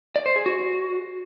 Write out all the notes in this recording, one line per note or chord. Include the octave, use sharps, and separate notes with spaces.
D5
C5
G#4
F#4